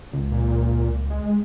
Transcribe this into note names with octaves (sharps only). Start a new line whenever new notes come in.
C#2
A#2
G#3